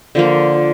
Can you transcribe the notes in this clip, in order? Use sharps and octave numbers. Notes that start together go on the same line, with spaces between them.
D3 F3 A#3